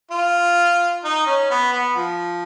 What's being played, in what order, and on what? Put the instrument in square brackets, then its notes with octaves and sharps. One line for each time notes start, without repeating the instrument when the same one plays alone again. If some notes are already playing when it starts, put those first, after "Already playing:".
[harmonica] F4
D#4
C#4
B3
B3
F3